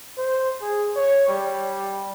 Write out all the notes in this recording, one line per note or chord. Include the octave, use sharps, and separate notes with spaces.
C5
G#4
C#5
G3